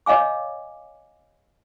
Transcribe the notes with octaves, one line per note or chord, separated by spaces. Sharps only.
C#5 D#5 F5 G#5 D6